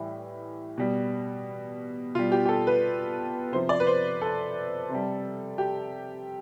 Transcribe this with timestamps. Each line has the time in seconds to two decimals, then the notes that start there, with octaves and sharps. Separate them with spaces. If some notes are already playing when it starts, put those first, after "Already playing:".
Already playing: A2 E3 G3
0.78 B2 G3
2.15 B2 G3 F4
2.32 G4
2.45 G4
2.49 A4
2.67 B4
3.52 C3 F3 C5
3.69 D5
3.80 B4
3.87 C5
4.21 A4
4.89 C3
4.95 G3
5.58 G4